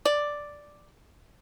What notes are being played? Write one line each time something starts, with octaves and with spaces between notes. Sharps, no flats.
D5